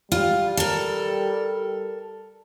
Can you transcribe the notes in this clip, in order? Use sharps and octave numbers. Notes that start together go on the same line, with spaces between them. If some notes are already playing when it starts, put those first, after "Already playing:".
G3 F4
A4 A#4